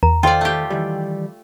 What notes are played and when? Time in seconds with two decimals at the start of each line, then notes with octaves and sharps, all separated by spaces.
0.03 E2 A#5
0.23 D#3 F4 A4 C5 D5 G5
0.41 A3 G4
0.70 D#3 E3 G3